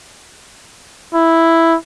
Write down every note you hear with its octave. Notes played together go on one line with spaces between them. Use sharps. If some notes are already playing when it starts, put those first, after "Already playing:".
E4